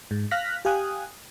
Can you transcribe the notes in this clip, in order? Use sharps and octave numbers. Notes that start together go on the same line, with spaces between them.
G#2
F5 F6 F#6 A#6 B6
G4 F5 G#5 D#6 F#6